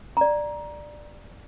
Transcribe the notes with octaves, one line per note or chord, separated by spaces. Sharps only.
D5 A#5